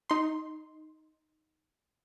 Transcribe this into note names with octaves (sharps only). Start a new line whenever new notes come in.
D#4 C6